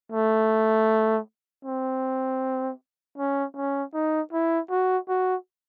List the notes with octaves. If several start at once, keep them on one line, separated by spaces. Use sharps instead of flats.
A3
C4
C#4
C#4
D#4
E4
F#4
F#4